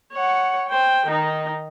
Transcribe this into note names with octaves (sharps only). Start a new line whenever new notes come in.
C#5 F#5
C5 G5
D#3 D#4